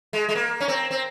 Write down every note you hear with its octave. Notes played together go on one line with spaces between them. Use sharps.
G#3
G#3
A#3
C#4
C4
C4